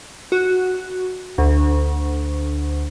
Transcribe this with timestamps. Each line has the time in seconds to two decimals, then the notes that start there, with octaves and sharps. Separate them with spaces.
0.32 F#4
1.38 D2